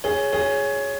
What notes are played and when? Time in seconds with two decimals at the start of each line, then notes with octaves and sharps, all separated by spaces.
0.04 G#4 C#5
0.32 G#4 C#5